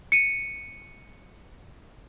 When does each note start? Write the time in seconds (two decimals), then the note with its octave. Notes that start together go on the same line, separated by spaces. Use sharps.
0.12 C#7 D#7